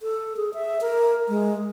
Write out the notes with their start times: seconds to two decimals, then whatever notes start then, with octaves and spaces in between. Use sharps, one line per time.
0.01 A4
0.37 G#4
0.54 E5
0.81 A#4
1.28 G#3